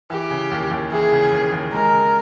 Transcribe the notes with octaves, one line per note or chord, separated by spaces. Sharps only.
E3 G4
C#3
D#2
D#2
E3 G#4
C#3
D#2
D#2
G#3 A#4
C#3